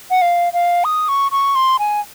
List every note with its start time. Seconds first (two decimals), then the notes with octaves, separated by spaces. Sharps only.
0.11 F#5
0.21 F5
0.53 F5
0.84 D#6
1.08 C#6
1.31 C#6
1.55 C6
1.79 G#5